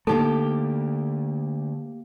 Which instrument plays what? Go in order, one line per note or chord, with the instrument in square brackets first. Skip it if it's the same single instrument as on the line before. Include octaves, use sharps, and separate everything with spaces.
[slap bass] D3 A3 [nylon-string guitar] A#3 G4 A5 [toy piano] D#4 A4